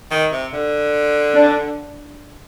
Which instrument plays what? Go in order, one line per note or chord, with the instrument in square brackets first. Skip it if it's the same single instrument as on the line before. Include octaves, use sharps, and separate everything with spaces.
[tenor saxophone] D#3
C3
D3
[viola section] D4